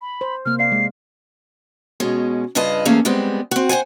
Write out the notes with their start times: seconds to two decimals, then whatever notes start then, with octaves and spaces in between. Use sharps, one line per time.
0.02 B5
0.21 C5
0.46 C3 A#3 F6
0.59 D5 F5 C7
0.72 G#3
2.00 B2 G#3 C#4
2.55 G2 C#3 F4 B4 D#5 A5
2.85 E2 A3 A#3 C#4 G#4 F5
3.05 G3 G#3 B3 C4
3.51 C4 F#4
3.69 C5 D5 F#5 G#5